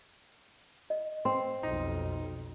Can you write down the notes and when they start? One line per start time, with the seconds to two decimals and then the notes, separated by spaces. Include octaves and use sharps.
0.90 D#5
1.25 C4 C6
1.63 B1 F2 D#4